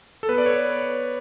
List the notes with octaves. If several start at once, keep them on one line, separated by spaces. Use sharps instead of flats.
A4
B3 B4
D5
C#5